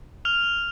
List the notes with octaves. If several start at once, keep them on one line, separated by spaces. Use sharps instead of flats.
F6 F7